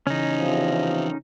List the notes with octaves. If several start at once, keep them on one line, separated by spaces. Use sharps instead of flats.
C#3 E3 C#4 D#4
E2 C3 F3